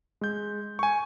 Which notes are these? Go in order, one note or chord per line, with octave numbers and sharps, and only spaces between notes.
G#3 G6
G#5 C#6